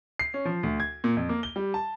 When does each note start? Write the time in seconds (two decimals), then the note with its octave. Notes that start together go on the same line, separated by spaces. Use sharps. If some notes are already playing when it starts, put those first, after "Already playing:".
0.19 C7
0.34 C#4
0.45 F3
0.63 D2
0.80 G#6
1.04 A#2
1.17 F2
1.29 A#3
1.43 G7
1.56 G3
1.74 A5